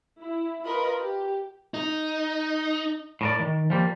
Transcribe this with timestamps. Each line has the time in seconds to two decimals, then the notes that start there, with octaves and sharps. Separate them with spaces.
0.21 E4
0.65 F4 A#4 B4 D#5 B5
1.00 G4
1.74 D#4
3.21 A2 A#4 D5
3.40 D#3
3.70 F3 G3 A#3